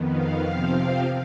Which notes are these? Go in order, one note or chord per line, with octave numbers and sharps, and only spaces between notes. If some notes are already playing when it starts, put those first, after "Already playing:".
Already playing: F2 D#3 B3
F5
C3 F3 C4 F5
F5